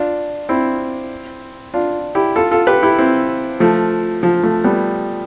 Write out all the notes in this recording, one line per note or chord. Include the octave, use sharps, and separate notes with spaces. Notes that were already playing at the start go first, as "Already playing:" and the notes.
Already playing: D4 F4
C4 E4
D4 F4
E4 G4
F4 A4
F4 A4
G4 B4
E4 G4
C4 E4
F3 A3
F3
F3 A3
G3 B3